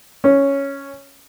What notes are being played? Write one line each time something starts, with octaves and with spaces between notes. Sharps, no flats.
C#4